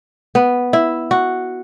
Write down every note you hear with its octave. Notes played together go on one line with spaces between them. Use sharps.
B3
E4
F#4